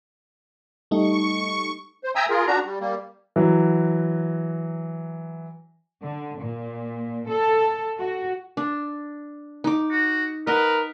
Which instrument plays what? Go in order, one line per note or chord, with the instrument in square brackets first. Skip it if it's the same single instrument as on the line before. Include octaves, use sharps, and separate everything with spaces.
[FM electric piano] G3 A3 D#4 [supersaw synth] C#6
[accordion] C5
E5 G5 G#5 A#5 D#6 E6
F4 G#4 A#4
D4 F#4 A#5
G3
G3 A#3
[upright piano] E3 F#3
[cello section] D3
A#2
A4
F#4
[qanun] D4
D#4 D6
[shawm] F#4
[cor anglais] A#4 [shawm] B4 [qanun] D#5 F#5